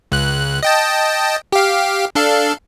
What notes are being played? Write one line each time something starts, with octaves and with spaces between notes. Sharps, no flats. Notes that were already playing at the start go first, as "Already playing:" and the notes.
C#2 F#6
D#5 G5 A5
G4 F5
D4 A4 F5